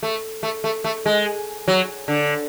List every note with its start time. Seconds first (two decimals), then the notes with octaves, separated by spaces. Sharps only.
0.03 A3
0.43 A3
0.64 A3
0.84 A3
1.06 G#3
1.68 F#3
2.08 D3